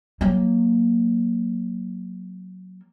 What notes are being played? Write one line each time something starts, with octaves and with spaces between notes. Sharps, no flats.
F#3 A#3